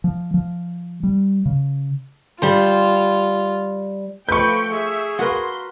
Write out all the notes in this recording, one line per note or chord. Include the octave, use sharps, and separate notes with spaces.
F3
F3
G3
C#3
G3 F4 C5
F3 A3 B4 G5 C#6 G6
G#4 E5
F#4 A#4 B4 C6